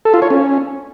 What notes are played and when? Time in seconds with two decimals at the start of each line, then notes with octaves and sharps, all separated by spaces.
0.05 A4
0.14 F4
0.22 C#5
0.30 C#4